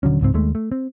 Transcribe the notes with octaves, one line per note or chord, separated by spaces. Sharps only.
D#1 D3 F#3 C#4
C#2 G#2 C4
D#2 D#3 G#3 A3
A3
C4